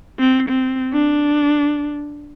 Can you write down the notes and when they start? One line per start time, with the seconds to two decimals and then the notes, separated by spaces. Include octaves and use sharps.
0.19 C4
0.49 C4
0.93 D4